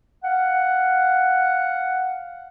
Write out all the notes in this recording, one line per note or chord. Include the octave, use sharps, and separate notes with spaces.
F5 F#5